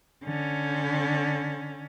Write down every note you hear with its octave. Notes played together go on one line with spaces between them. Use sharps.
D3 C#4